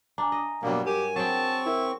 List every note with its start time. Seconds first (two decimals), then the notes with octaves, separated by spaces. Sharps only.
0.18 D4 G#5 A#5
0.32 D#5
0.63 G2 B2 F#3 G3 A#3
0.86 G4 A#4 G#5
1.16 F#3 C4 G#4 G5 A5 C#6
1.66 E4 A#4